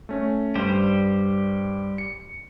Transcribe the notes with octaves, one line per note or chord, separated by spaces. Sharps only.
A3 C#4
G2 G3 G4 C5
C#7